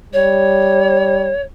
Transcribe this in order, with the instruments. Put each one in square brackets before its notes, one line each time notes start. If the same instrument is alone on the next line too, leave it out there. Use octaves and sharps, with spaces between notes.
[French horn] G3 [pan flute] C#5